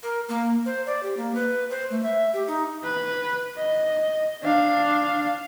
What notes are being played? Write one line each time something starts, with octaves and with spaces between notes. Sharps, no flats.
A#4
A#3
C5
D5
G4
A#3
B4
C5
A3
E5
G4
D#4
B4
D#5
D4 F5